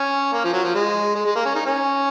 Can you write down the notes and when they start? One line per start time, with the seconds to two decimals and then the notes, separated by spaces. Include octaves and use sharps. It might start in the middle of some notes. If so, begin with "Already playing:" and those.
Already playing: C#4
0.33 A#3
0.44 F3
0.53 F#3
0.64 F3
0.75 G#3
1.15 G#3
1.26 G#3
1.35 A#3
1.46 C#4
1.55 D#4
1.65 C#4